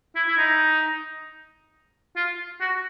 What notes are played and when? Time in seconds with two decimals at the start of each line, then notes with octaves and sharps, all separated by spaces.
0.15 E4
0.28 E4
0.37 D#4
2.16 F4
2.60 F#4